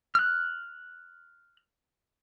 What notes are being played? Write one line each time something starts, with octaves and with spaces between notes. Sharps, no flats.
F6 F#6